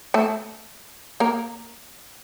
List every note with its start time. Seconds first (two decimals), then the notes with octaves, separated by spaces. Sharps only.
0.14 A3 A4
1.20 A#3 A#4